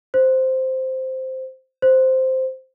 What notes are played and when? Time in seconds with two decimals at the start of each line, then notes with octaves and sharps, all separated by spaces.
0.14 C5
1.82 C5